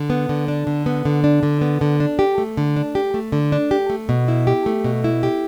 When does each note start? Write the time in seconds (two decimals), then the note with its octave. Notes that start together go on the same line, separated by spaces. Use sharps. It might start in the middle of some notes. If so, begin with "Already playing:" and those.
Already playing: D3
0.10 B3
0.29 D3
0.48 D4
0.67 D3
0.86 B3
1.05 D3
1.24 D4
1.43 D3
1.61 B3
1.81 D3
2.00 D4
2.19 G4
2.38 A3
2.57 D3
2.76 D4
2.95 G4
3.14 A3
3.32 D3
3.52 D4
3.71 G4
3.90 A3
4.09 B2
4.28 E4
4.47 G4
4.66 A3
4.84 B2
5.04 E4
5.23 G4